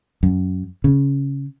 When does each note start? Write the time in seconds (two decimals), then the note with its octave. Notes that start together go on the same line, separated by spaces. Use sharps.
0.23 F#2
0.84 C#3